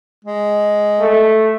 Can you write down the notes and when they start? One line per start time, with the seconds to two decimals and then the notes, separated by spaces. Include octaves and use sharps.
0.24 G#3
1.00 A3